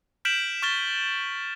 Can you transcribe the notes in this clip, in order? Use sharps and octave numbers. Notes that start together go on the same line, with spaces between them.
F6 G6 B6 D7 E7 F#7
C#6 F6 A6 E7 G7